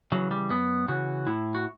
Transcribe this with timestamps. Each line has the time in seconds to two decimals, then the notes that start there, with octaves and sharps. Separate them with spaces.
0.12 C#3 E3 F#3
0.31 G3
0.50 F#2 B3
0.88 C#3 E3 F#4
1.27 A2 E4
1.55 F#4